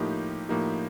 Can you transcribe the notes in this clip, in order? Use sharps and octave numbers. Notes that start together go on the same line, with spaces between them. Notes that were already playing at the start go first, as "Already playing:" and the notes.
Already playing: A2 F3 A#3 D#4 G4
A2 F3 A#3 D#4 G4